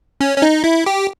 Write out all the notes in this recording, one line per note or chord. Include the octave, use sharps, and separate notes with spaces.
C#4
C#4
D#4
E4
G4